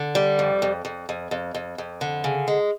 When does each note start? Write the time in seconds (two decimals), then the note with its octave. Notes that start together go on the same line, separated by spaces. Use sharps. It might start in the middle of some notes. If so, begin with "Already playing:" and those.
Already playing: D3
0.15 G3
0.39 F2
0.62 F2
0.85 F2
1.09 F2
1.31 F2
1.54 F2
1.78 F2
2.01 D3
2.24 C#3
2.48 G#3